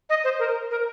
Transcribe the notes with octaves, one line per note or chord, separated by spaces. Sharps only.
D#5
C5
A#4
A#4